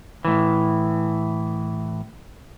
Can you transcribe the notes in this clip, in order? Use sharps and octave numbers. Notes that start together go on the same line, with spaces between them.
A2 E3